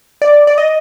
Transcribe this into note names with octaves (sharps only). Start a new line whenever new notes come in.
D5
D5
D#5